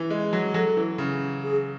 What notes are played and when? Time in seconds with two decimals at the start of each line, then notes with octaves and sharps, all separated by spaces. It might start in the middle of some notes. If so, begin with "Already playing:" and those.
Already playing: E3
0.10 G#3
0.33 F#3
0.54 F#3 A4
0.77 E3
0.98 C#3
1.43 G#4